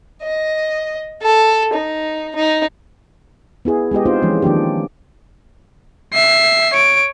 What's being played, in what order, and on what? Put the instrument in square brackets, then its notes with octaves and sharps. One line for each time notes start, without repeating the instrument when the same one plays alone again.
[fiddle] D#5
A4
D#4
D#4
[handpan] B3 E4 G#4
G#3 B3 G4 D#5
C4 D#4 F4 C5
E3 F3 G#3 C#4
D#3 F3 A#3 D4 G4
[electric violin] E5 C7
C#5 D7